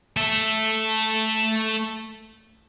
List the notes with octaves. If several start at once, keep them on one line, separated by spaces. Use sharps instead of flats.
A3 E5